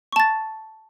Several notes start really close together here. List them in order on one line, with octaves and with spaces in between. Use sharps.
C#6 A5 A6